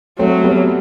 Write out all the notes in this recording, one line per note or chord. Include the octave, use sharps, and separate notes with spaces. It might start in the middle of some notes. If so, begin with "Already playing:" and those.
F#3 A3 C4
G3 B3